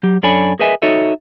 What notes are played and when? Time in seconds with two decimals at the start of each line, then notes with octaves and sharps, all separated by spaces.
0.03 F#3 G4
0.23 F#2 D4 A4 C#5 G#5 B5
0.59 G#4 A#4 B4 D#5 E5 G#5
0.82 D#4 F#4 A4 C#5 D#5 E5